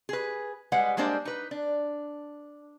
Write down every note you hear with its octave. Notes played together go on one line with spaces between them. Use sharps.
G#4 B4
G3 G#3 B4 F#5
G3 G#3 A#3 D4 C5
D#4 B4
D4